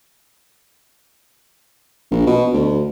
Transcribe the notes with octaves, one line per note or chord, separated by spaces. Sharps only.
A#1
B2
D2